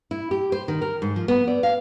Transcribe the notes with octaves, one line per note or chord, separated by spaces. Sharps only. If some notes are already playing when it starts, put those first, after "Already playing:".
E4
G4
C5
D#3
A#4
G#2
F3
B3
D5
F5